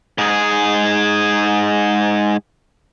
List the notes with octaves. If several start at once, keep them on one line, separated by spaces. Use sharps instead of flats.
G#2 G#4